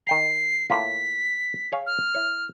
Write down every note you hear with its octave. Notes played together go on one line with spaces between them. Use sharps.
D#3 G5 A#5 C7
A2 A#3 F4 B6
G#4 C#5 F5
F6
E4 C#5